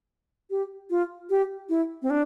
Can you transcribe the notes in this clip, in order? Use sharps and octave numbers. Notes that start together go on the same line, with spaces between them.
G4
F4
G4
E4
C4
D4